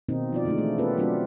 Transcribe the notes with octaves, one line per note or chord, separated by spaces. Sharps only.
B2 D#3 A#3 C4 D#4
F3 F4 D5
D3 D#3 G#3 A3 D#4
E3 A3 A#3
B3 C#4 F4 G4 A4 B4
F#3 A3 C4 D4 F4 A4